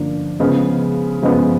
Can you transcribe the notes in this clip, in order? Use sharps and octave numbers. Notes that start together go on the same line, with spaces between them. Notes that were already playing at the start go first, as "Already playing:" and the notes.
Already playing: D3 F3 A#3 D4
C#3 F3 G#3 B3
C#3 F3 G#3 B3